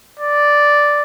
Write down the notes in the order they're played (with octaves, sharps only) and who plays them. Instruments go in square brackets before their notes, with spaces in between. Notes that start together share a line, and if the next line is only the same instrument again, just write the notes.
[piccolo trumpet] D5